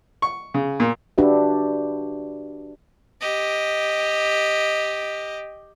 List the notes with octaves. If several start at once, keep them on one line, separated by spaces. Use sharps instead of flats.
C#6
C#3
A#2
D4 F#4 G4 B4 E5
G4 D#5